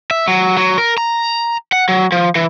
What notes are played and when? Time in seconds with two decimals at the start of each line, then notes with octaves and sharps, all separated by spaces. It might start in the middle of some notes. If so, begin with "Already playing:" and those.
0.11 E5
0.28 F#3
0.57 F#3
0.78 A#4
0.98 A#5
1.73 F#5
1.89 F#3
2.12 F3
2.35 E3